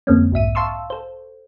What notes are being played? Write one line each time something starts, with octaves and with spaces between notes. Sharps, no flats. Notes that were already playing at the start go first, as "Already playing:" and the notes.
F2 D3 G#3 A#3 C4 C#4
B1 G#2 E5 D#7
F5 A5 C6 C#6 E6
A4 C5